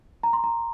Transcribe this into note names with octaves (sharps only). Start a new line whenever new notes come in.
A#5
C6
A#5